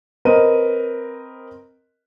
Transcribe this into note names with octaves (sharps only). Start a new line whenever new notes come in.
C4 A#4 B4 D#5 D#7